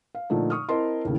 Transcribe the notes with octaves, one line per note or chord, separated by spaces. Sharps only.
F5
A#2 D3 F3 A3 D#4
C#6 D#6 F6
C4 E4 A#4 D#5 A5 C6
D#2 A2 C#3 E3